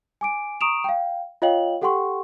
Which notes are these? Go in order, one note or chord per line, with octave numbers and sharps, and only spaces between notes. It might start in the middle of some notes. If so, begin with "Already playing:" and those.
G#5 D6 D7
A#5 C#6 D#6 D7 E7 F7
F5 G5
F4 C#5 D#5 F5 G5 F#7
G4 A4 F#5 G5 C6 C#6